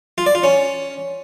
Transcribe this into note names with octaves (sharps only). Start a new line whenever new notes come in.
F4
D5
F4
C#4